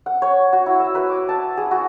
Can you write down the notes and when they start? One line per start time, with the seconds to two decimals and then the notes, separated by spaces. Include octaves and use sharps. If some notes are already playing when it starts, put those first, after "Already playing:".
0.06 F#5
0.22 C#5
0.53 F#4
0.66 E4
0.80 E5
0.95 B4
1.10 D6
1.29 A5
1.57 G#4
1.71 F#4